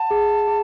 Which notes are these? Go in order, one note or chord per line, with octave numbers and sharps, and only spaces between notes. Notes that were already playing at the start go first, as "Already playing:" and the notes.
Already playing: F#5 A5
G#4
G#4